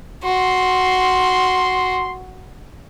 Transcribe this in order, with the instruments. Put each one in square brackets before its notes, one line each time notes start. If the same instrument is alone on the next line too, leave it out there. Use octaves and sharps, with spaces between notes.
[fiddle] F#4 [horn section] C6